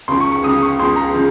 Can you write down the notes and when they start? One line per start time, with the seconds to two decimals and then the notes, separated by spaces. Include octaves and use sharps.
0.08 C#2 C#3 F3 C6
0.20 C#6
0.32 C#6
0.43 C#2 C#3 F3 D#6
0.62 C#6
0.79 C#2 C#3 F3 C6
0.96 A#5
1.14 C#3 F3